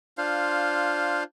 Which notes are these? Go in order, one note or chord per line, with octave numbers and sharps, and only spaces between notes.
D4 F4 C5 F5